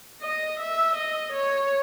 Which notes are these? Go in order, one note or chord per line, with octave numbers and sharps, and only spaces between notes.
D#5
E5
D#5
C#5